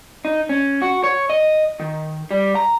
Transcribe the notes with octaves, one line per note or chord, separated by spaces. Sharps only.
D#4
C#4
F#4
C#5
D#5
D#3
G3
A#5